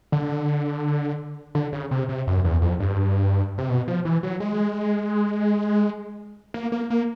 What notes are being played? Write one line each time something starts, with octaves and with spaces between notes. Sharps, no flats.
D3
D3
C#3
C3
C3
F#2
E2
F2
G2
C3
B2
F3
E3
F#3
G#3
A#3
A#3
A#3